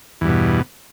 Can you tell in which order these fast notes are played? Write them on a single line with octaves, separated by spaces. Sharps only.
E2 G2 B2